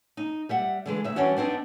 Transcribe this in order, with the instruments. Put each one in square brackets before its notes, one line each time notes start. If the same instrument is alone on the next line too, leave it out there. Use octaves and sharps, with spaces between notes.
[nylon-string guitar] D#4
G3 E5 F#5
D3 E3 G#3
D2 E5
E3 G3 C#4 D4 F#4
B3 C4 D4 D#4